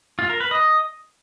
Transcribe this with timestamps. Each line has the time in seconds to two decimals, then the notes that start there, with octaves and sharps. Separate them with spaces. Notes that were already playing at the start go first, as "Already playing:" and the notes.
0.19 F4
0.30 A#4
0.40 B4
0.51 D#5